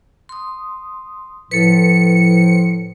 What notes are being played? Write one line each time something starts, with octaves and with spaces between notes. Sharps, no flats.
C6 D#6
A2 F3 A4 B4 C#7